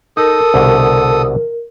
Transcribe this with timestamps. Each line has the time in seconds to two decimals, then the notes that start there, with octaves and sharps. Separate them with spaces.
0.17 D#4 A4 A#4 D#6
0.54 C2 B2 D3